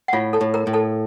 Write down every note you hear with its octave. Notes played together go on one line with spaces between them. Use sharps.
F#5
A2 F4 F5
A4 A5
A2
A#4 A#5
A2
A4 A5